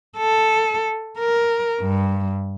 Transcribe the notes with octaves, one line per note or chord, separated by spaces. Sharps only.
A4
A#4
G2